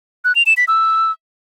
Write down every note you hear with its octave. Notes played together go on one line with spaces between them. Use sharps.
F#6
F7
E7
B6
E6